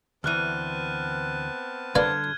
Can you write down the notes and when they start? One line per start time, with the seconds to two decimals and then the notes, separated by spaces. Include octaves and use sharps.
0.24 D2 E3 B3 C4 A5 F6 F#6 D#7
1.95 D3 G3 A#3 B4 D5 F6 G#6